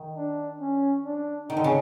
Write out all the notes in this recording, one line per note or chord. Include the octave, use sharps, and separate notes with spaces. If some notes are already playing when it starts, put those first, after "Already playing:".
Already playing: D#3
D4
C#4
D4
D#3 D#4
D3
C#3